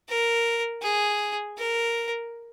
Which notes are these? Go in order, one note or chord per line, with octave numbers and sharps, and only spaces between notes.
A#4
G#4
A#4